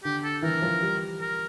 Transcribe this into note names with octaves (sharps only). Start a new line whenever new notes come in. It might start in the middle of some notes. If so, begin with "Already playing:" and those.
D3 G4
A4
E3 A#4
F3
G3
A#4